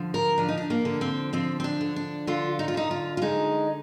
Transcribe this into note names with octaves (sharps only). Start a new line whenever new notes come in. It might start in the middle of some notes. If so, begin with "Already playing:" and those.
Already playing: D3 F3
A#4
F3 D4
D#4
D4
A#3
D3
C4
F3 C4
C4
D4
D3
D4
D3 F4
D#4
F4
D3 D#4
F4
F4
G#3 D#4